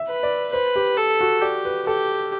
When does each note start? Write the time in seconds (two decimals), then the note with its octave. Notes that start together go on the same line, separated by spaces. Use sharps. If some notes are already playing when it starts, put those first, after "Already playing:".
Already playing: E5
0.08 B4
0.23 D5
0.53 B4 C5
0.76 G4
0.97 A4
1.21 F#4
1.42 G4 D5
1.65 B4
1.87 G4 A4